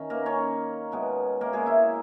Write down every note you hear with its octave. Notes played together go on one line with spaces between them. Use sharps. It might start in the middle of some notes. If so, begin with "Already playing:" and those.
Already playing: D#3 C#4
A#3 A#4
C#4 C#5
B2 G#3 B3
A#3 A#4
G#3 G#4
E4